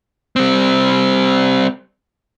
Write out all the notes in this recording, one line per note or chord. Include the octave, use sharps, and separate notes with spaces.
G3 C4